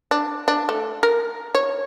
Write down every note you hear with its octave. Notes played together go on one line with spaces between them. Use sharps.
D4
D4
A3
A#4
C#5